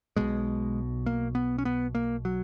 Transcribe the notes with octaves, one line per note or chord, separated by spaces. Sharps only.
B1 B2 G#3
A#3
B3
C#4
B3
A#3
F#3